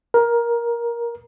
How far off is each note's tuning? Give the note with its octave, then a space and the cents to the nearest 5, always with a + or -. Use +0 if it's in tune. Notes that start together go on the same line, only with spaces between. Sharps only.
A#4 +15